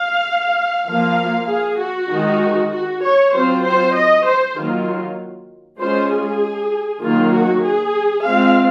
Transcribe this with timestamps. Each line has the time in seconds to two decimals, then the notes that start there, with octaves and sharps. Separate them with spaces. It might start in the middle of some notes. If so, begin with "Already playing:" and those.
Already playing: F5
0.87 F3 A#3 F4 F5
1.49 G#4
1.80 F#4
2.10 D#3 G#3 D#4
2.72 F#4
3.03 C#5
3.33 F#3 C4 F4 C5
3.64 C5
3.95 D#5
4.25 C5
4.56 D#3 F#3 A#3 F4
5.80 G#3 C#4 F4 C5
6.10 G#4
7.02 D#3 F#3 A#3 F4
7.33 F#4
7.64 G#4
8.26 G#3 C4 F4 F5